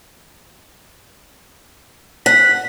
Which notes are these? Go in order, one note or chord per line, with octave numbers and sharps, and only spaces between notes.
F#5 B6